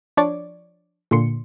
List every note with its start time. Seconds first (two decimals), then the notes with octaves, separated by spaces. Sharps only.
0.17 F3 D4 C#5 D5
1.11 A#2 D3 C6 C#7